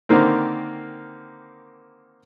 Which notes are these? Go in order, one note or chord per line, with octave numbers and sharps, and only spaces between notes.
D3 D#3 A#3 C4